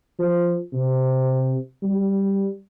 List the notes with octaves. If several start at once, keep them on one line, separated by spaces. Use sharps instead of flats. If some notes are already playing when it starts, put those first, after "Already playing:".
F3
C3
G3